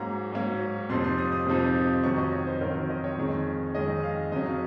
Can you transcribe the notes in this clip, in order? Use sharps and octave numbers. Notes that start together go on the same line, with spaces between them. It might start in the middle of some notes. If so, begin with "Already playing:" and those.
Already playing: G#2 F#3 A#3 C#4 A#5
G#2 F#3 A#3 C#4
F2 C3 F3 A#3 D#4 C6
C6
D#6
D#6
F2 C3 F3 A#3 D#4
F2 D#3 F#3 C#4 C#6
D#5
C#5
C5
F2 D#3 F#3 C#4 A#4
C5
D#5
C#5
F2 D#3 G#3 C#4
F2 D#3 G#3 C#4 D#5
F5
F2 C#3 F#3 C#4 D#5